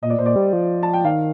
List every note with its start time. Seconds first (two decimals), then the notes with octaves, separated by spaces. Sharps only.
0.02 A#2 D#5
0.10 D5
0.18 A#2 C5
0.26 D5
0.36 G3
0.53 F3
0.83 A5
0.93 G5
1.04 D#3 F5